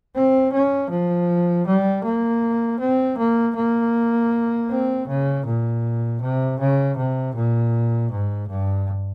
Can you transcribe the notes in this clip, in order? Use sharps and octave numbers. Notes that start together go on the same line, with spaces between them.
C4
C#4
F3
G3
A#3
C4
A#3
A#3
C4
C#3
A#2
C3
C#3
C3
A#2
G#2
G2